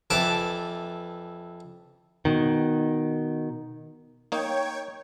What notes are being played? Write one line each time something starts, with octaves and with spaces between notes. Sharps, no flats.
F2 E3 A5 D6
B2 D#3
A#3 D#4 C#5 G5 G#6